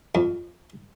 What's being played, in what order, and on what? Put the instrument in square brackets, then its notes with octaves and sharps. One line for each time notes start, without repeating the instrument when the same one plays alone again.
[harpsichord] F2